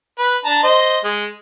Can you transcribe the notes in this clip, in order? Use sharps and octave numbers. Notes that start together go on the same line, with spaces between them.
B4
D4 A5 A#5
C5 D#5
G#3